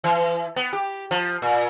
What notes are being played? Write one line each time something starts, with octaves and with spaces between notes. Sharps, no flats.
E3
B3
G4
F3
A#2